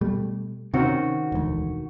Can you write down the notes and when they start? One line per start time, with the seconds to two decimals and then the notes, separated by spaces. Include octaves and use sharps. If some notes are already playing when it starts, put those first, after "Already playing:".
0.01 B2 G3 A3
0.74 C3 D#3 C4 C#4 F#4
1.32 E1 D2